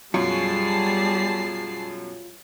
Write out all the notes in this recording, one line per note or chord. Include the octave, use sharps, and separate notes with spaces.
F#2 B2 G3 F4 G#4 A5 C7